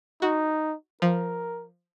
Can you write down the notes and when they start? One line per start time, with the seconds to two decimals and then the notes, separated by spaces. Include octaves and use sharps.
0.22 D#4 F#4
1.02 F3 A#4